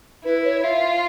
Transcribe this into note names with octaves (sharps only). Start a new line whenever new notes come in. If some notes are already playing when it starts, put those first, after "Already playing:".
E4 B4
C#5
F4 E5